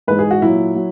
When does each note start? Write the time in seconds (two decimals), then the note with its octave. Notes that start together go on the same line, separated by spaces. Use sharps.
0.07 G#2 E3 G#3 B4
0.19 G#4
0.31 F#4
0.42 A#2 F#3 E4
0.75 F#3